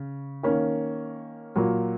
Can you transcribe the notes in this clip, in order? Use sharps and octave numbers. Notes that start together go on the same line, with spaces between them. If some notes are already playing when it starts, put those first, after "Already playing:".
Already playing: C#3
D#3 A#3 C#4
A#2 F#3 A#3